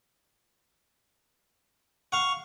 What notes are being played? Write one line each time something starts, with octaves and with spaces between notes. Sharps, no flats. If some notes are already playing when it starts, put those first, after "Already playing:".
F5 F#5 C#6